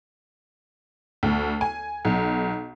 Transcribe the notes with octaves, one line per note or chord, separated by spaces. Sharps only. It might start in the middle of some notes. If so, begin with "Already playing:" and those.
D2
G#5
B1